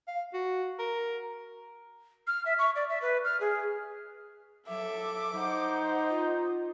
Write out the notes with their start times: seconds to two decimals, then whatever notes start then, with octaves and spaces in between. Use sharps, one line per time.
0.07 F5
0.33 F#4
0.79 A#4
2.27 F6
2.46 E5
2.59 C#6
2.76 D5
2.89 E5
3.02 B4
3.25 F6
3.41 G#4
4.69 F#3 A4 E5 D6
5.35 D#4 C5 F#5
6.09 F4